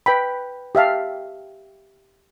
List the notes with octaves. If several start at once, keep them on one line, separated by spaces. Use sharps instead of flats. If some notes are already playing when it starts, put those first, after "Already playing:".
B4 G5 B5
G4 E5 F5 A5